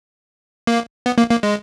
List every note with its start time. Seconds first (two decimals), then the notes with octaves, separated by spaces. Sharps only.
0.67 A#3
1.06 B3
1.18 A#3
1.31 A#3
1.43 G#3